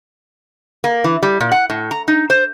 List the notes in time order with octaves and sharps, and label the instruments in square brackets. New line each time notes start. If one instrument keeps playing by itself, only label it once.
[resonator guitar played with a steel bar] A#3
E3
G3
A#2
F#5
A2
A#5
D#4
C5